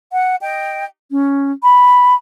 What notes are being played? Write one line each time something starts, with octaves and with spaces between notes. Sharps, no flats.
F#5
D#5 G5
C#4
B5